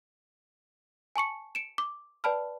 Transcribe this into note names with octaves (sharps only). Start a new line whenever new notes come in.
G#5 A5 C#6 C#7
C#7 D7 E7
D6
B4 D5 G5 A5 B5 F6